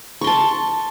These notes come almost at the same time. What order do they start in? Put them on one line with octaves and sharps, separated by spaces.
C#6 C6 A5